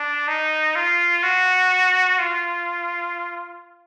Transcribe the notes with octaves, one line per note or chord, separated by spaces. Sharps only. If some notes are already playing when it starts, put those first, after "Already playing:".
Already playing: D4
D#4
F4
F#4
F4